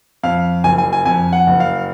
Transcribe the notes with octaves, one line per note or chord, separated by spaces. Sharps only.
F2 F5
F#1 G#5
G#5
G#5
F2 G#5
F#5
F#1
F5